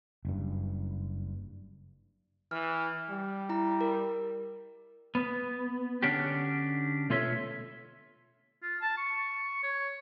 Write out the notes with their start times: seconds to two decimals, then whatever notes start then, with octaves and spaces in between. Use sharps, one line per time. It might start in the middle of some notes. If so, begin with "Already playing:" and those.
0.25 F#1 G2
2.51 E3 F6
3.10 G3
3.49 E4 A#5
3.81 A#4
5.15 B3
6.03 D3 C#4 D4 F#4 G4
7.10 B2 A3 F4 A4 C#5 E5
8.63 F4
8.81 A5
8.98 C#6
9.63 C#5